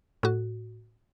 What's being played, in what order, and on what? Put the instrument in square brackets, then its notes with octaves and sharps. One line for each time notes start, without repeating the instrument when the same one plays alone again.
[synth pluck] A2 F#4